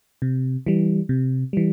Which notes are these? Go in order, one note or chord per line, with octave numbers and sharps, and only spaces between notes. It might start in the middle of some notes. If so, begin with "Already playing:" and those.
C3
E3 G3
C3
E3 G3